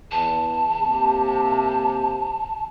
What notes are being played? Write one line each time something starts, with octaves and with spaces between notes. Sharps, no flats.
E2 A5
C3 A#3 G4